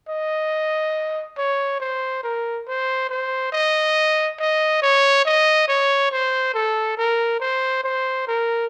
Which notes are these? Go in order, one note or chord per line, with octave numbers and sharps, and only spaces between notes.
D#5
C#5
C5
A#4
C5
C5
D#5
D#5
C#5
D#5
C#5
C5
A4
A#4
C5
C5
A#4